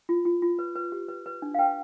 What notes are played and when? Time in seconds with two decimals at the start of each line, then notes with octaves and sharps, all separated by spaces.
0.09 F4
0.25 F4
0.42 F4
0.59 B4
0.75 B4
0.92 G4
1.08 B4
1.26 B4
1.42 D4
1.54 F5
1.59 B4 G5